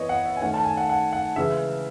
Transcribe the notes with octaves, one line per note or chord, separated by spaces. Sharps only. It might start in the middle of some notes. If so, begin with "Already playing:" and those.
Already playing: E3 B3 C#5 D#5
F#5
E5
G#5
D#3 A3 C#4 F#5
A5
G#5
F#5
F#5
F#5
C#3 E3 G#3 E5